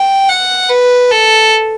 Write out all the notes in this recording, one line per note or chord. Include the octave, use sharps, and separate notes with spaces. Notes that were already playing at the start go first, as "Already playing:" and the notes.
Already playing: G5
F#5
B4
A4